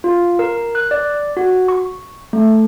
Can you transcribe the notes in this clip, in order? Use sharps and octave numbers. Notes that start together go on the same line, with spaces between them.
F4
A#4
F#6
D5
F#4
C#6
A3